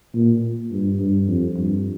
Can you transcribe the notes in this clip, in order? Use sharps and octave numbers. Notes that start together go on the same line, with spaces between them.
A#2
G2
G2
F2
G2